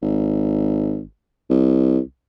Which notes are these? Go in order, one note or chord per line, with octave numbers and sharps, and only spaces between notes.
G#1
C2